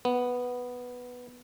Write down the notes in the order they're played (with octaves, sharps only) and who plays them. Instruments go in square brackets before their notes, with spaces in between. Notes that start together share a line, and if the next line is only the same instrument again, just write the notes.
[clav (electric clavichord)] B3